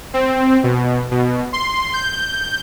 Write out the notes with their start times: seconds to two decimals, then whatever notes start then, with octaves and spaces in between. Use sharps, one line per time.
0.14 C4
0.63 B2
1.11 B2
1.53 C6
1.94 G6